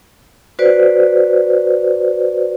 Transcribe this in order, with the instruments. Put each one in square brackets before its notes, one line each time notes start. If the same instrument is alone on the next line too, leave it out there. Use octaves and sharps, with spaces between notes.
[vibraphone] F#4 B4 C5 D5